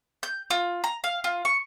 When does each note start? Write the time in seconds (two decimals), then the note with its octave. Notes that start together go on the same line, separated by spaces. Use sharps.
0.23 G6
0.50 F4
0.84 A#5
1.04 F5
1.24 F4
1.45 C#6